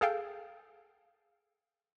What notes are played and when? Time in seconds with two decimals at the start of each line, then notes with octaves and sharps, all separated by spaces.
0.01 G#4 A4 F5 G5